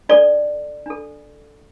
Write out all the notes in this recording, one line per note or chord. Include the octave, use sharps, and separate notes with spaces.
D4 A4 D5
D4 A4